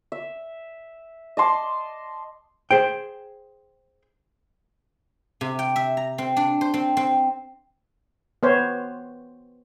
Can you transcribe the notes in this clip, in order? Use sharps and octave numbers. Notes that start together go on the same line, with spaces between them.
E5
D#5 A5 C6 D6
G#4 C5 G5
C3
G5
E5
A#5
C4
D4
C5
C4
C4
B3 C5 C#5